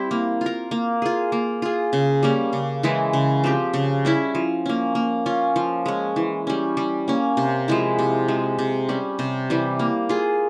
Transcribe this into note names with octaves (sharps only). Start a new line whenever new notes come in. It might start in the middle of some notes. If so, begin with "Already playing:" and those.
Already playing: G3 C4 E4
A#3
F4 A#4
A#3
F4 G#4
A#3
F4 G#4
C#3
G3 A#3 C#4
C#3
E3 G#3 E4
C#3
F3 C4 G4
C#3
G3 C#4 E4
F3
A#3 C#4
A#3
C#4 F4
F3
G#3 C#4
E3
G3 C#4
G3
A#3 C#4
C3
F3 G#3 E4
C3
F3 G#3
C3
G3 C#4
C3
E3 G3
A#3
F4 G#4